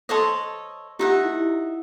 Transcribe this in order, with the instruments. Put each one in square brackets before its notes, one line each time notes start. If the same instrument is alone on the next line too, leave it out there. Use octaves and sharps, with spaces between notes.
[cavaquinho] A4 C#5 D#5 [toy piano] C5 F#5 C6
[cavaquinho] D#4 E5 F#5 [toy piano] F4 G4
[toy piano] E4